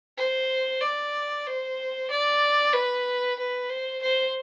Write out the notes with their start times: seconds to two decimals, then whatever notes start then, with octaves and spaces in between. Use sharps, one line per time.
0.17 C5
0.81 D5
1.47 C5
2.10 D5
2.73 B4
3.39 B4
3.69 C5
4.02 C5